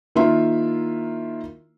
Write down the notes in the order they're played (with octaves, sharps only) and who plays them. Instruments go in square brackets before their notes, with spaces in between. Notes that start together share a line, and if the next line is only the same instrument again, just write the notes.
[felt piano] D#3 A#3 E4 F4 E5 C6